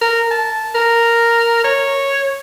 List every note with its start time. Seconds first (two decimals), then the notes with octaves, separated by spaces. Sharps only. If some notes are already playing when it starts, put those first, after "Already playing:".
0.01 A#4
0.31 A5
0.75 A#4
1.64 C#5